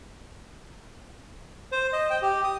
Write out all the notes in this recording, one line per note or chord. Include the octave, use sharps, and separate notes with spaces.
C5
D#5
G5
G4
D#6